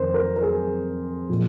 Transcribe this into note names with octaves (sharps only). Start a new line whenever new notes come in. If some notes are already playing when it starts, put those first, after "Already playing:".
Already playing: F2 D#3 A#4 C5
A#4
A#4
G#4
A#2 F3